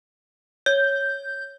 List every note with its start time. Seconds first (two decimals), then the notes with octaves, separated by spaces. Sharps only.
0.66 C#5 G6